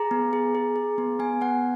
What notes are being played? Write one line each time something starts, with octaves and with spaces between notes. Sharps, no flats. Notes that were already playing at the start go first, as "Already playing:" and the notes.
Already playing: G#4 A#5
B3
G#4
G#4
G#4
B3
B3 G#5
B3 F#5